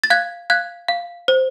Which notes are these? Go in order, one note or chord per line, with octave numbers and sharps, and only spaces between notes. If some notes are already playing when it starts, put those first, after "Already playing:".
A6
F5 F#6 G#6
F5 F#6 G#6
F5
C5